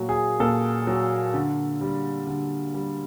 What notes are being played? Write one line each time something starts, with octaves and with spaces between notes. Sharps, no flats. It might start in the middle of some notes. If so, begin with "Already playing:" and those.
Already playing: A#2 F#3
G#4
A#2 A4
F#3
D3
G3
D3
G3